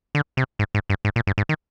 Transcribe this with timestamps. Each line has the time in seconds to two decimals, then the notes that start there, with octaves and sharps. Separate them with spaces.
0.15 D3
0.37 C3
0.59 G#2
0.75 G#2
0.90 G2
1.05 G#2
1.16 A#2
1.27 G2
1.38 G#2
1.49 D#3